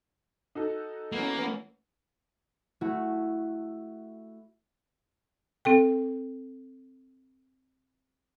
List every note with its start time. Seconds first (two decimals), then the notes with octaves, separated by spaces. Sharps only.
0.55 D#4 F#4 A4
1.12 E3 A#3 B3 C#4
2.81 A3 E4 F#4
5.65 C4 A4 G5